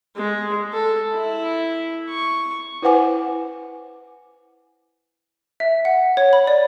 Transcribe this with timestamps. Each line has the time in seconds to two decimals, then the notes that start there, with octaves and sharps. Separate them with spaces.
0.16 G#3
0.73 A4
1.14 E4
2.10 C#6
2.82 E4 B4 C5 F#5 G#5 D6
5.60 E5
5.85 F#5
6.17 C#5
6.33 B5
6.47 D5